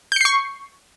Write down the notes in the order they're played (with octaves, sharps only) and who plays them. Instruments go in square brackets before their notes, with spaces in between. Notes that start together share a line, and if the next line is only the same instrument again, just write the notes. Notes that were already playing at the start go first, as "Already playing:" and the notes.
[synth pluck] G6
C#7
C7
C#6